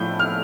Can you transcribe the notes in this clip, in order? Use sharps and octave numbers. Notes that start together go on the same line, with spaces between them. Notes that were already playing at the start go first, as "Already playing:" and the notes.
Already playing: A2 F3 A3 E4 G6
F6